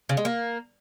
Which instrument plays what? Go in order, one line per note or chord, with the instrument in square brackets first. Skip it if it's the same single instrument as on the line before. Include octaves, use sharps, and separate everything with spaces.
[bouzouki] C#3
G#3
A#3